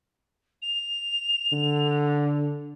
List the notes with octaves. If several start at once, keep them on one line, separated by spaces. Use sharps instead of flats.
F7
D3